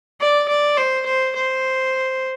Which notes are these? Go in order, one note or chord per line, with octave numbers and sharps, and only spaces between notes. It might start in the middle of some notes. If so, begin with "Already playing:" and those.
D5
D5
C5
C5
C5